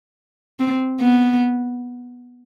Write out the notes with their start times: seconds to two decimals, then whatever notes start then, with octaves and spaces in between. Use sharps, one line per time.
0.60 C4
1.01 B3